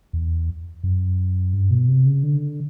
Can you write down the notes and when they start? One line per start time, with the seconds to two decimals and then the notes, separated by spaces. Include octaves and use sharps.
0.13 E2
0.84 F#2
1.53 G2
1.71 B2
1.88 C3
2.06 C#3
2.23 D3